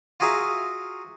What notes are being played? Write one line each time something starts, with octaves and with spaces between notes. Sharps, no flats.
F4 F#4 G#4 A#4 E5 F5